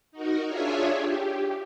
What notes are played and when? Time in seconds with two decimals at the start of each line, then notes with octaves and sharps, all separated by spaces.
0.12 D#4 F#4 A#4
0.47 D4 F4 G#4 C#5 E5 G#5
0.93 G4